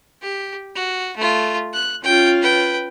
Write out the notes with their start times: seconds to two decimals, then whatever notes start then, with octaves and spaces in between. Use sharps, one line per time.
0.22 G4
0.75 F#4
1.17 A3 F4
1.73 F#6
2.04 C#4 F4 G5
2.42 B4 G5